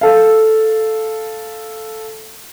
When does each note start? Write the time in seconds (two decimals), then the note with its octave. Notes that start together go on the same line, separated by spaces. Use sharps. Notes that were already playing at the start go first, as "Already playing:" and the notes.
0.01 A4 F5